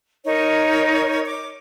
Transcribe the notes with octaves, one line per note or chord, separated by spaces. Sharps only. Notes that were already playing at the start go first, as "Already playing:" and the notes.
D#4 A#4 C#5
D6